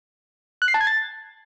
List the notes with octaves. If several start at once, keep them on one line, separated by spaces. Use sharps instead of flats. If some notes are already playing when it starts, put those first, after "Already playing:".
F#6
C7
A5
G#6
A6